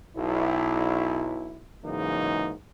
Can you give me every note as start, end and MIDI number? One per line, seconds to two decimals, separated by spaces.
0.16 1.61 35
0.16 1.61 64
1.85 2.53 44
1.85 2.53 49
1.85 2.53 52
1.85 2.53 54
1.85 2.53 58
1.85 2.53 63